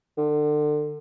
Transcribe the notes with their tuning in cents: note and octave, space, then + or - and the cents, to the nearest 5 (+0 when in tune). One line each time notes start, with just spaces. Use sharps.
D3 +30